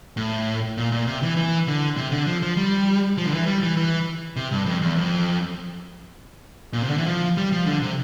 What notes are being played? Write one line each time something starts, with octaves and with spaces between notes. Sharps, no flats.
A2
A#2
A#2
C3
E3
E3
D3
C3
D3
F3
F3
G3
F3
D3
E3
G3
E3
E3
C3
G2
F2
E2
F2
A#2
C3
D3
E3
F3
G3
F3
D3
C3